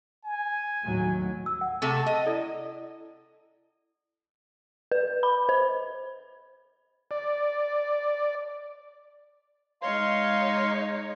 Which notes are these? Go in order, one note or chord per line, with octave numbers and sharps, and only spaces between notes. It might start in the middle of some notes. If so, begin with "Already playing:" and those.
G#5
D#2 A2 F#3
E6
F#5
C3 A3 A4
D#5
E4 A4 D5
B4
B5
C5
D5
G#3 D#4 C#5 F5 C6